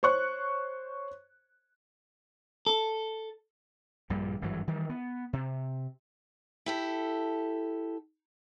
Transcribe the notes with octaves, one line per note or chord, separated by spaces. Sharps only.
C5 C#5 C#6 F#6
A4
A#1 G2 A#2 G3
G#1 G2 E3 F#3
D#3 E3 G3
B3
C3
E4 G4 A4